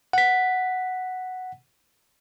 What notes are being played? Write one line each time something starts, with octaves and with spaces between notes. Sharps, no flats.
F#5 B6